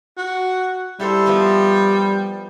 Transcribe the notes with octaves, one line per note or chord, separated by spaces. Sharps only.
F#4
G3 E4 A4 C5
F3 B3 C5